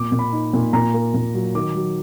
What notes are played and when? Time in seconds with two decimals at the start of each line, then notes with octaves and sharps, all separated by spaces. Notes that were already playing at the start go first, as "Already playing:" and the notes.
Already playing: A#2 D6
0.12 A#2
0.19 B5
0.33 D#4
0.53 A#2
0.73 A#2 A#5
0.94 A#3
1.14 A#2
1.35 F#3
1.55 D#3 D6
1.75 F#3